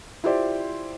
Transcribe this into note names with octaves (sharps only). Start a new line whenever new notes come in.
E4 F4 G4 C5 D5